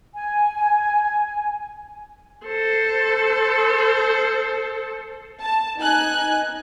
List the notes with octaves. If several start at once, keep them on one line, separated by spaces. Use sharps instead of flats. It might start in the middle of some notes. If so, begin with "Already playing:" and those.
G#5
A4 C5
A5
D#4 G#5 F#6